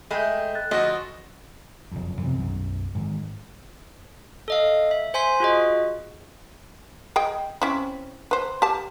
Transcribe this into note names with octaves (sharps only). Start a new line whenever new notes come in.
G#3 A3 D#5 E5 G5 G#5 B5 G6
F#6 A6
D2 F3 F#4 D#5 D#6
F#1 F2
F2 C3 E3 C4
B1 F#2
G#2 D#3 E3
A4 D#5 F5
E5
C5 G#5 C6 B6
F4 F#4 G#4 D#5
G#4 D#5 G5
C4 C#4 E4
B4 C5
G4 A5